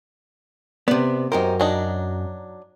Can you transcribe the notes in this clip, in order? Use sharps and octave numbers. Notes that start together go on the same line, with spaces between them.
C3 B3 D5
F#2 D#4 G4 A#4 C5
F#3 D4 D#4